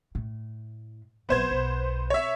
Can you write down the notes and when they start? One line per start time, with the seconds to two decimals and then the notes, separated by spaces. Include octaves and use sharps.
0.15 A2
1.29 A#1 F#3 B3 C5 G#6
1.51 B1
2.10 C#5 E5